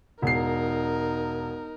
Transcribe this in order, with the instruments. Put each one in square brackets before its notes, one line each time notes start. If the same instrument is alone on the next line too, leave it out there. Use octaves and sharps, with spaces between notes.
[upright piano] E1 C7 [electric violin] D#4 A#4